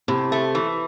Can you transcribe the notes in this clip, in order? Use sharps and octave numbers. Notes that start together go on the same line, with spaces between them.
A2 C3
A3
E3